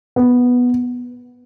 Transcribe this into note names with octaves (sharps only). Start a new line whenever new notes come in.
B3